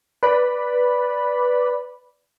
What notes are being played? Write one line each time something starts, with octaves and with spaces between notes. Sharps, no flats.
B4 D5 B5